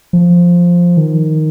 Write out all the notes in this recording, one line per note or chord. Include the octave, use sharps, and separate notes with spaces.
F3
D#3